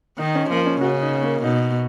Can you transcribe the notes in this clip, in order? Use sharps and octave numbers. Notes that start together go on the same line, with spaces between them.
D#3 D#4
C#4
F3 A#3
C#4
C#3 F#4
D#4
A#3
B2 D#4